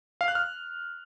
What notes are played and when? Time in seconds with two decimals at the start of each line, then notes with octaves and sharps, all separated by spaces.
0.21 F5
0.28 F#6
0.35 F6